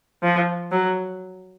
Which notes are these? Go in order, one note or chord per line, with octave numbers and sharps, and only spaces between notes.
F3
F#3